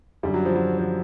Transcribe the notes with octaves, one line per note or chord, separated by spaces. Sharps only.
F#2 D3 G3
F#3
F3
F#3
F3